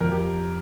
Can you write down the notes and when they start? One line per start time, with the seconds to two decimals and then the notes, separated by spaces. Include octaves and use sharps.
0.01 F2 A#4
0.12 G4